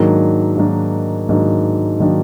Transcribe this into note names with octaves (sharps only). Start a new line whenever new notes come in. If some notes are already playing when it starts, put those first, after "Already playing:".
Already playing: G#2 D#3 F#3 A#3 D4
G#2 D#3 F#3 A#3 D4
G#2 D#3 F#3 A#3 D4
D#3 F#3 A#3 D4